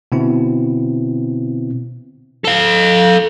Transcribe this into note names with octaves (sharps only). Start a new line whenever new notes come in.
B2 D3 B3 C4 E4
A4 F5